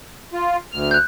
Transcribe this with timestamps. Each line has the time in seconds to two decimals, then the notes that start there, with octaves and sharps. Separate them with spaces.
0.33 F4
0.72 D2 F6
0.91 F#6 G6